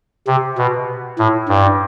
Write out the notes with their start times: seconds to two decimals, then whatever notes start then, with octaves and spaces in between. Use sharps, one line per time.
0.27 C3
0.58 B2
1.19 A2
1.49 G2